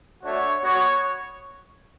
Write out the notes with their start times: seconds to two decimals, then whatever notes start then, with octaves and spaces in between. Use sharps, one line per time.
0.23 A3 D4 F#4 C#5
0.62 B3 F#4 C#5